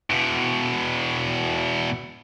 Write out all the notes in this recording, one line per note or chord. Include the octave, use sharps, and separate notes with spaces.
E2 B2